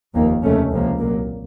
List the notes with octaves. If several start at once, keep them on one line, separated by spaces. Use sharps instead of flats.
F1 D#2 D#3 A#3
F1 D#2 C#3 A3 C#4
C#2 C3 F3 A#3
C2 A#2 F#3 A#3